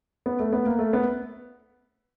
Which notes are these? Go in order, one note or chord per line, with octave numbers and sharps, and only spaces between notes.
B3
A3
B3
A#3
A3
B3